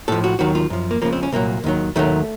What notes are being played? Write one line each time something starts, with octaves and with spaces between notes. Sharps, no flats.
A2 F3 A4
F#4
D#2 D#3 F#3 F#4
F4
F#2 F3
A#3
C#2 C#3 F3 A#3
C4
C#4
C2 A#2 F#3 A#3
D#2 D#3 F#3
D#2 D#3 F#3 A3